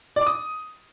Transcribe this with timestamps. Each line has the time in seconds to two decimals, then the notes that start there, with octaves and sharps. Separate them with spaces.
0.16 D5
0.21 D6
0.27 D#6